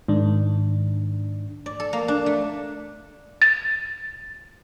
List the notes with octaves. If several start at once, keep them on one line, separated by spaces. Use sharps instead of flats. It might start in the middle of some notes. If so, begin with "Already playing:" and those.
G#2 D#3 D4
D5
A4
A#3
D4
A3
A6